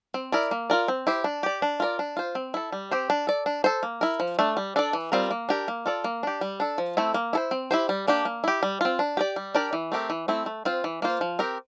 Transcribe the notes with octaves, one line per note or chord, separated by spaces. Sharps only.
C4
E4 A#4 D5
A#3
F4 A#4 D5
C4
E4 G4 C5
D4
G4 D5
D4
F4 A#4 D5
D4
F4 C5
C4
E4 A4
G3
C4 G4 C5
D4
A4 D5
D4
A4 C5
A#3
E4 A#4
F3
A3 D4
G3
D4 A4 D5
E3
G3 C4 F4 A#4
A#3
D4 G4 A#4
A#3
F4 A4 D5
A#3
D4 G4
G3
D4 A4
F3
A3 C4 E4 A4
A#3
E4 A4 C5
C4
E4 G4 C5
G3
A#3 D4 G4
A#3
E4 G4
G3
C4 F4
D4
G4 A#4 D5
G3
D4 G4 A#4 D5
E3
A3 C4 G4 A#4
E3
A3 C4 E4
A3
C4 F4 C5
E3
A#3 F4 C5
F3
C4 G4 A#4